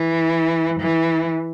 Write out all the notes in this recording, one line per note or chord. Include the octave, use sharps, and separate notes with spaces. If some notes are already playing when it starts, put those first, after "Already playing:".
Already playing: E3
E3